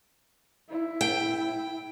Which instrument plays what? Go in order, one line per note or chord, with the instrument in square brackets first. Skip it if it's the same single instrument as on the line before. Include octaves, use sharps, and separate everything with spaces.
[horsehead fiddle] E4
[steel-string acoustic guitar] G5